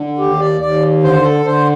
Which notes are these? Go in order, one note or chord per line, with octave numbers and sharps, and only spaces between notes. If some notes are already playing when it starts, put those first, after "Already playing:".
Already playing: D3
D#2 G4
D5
D#2 D5
D3 C5
A4
D3 C5